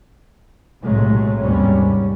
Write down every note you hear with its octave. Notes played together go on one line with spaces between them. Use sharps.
B1 A2 C3 F#3 G#3 A3
D#2 G#2 C3 G3 C#4